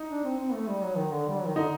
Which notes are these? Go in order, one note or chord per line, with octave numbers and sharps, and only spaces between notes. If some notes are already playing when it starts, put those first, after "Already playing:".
Already playing: D#4
D4
C4
C4
A3
G3
F#3
D#3
D3
G3
F#3
D#3
D3 D#4